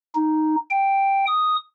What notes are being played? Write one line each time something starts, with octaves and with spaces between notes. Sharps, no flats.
D#4
G5
D#6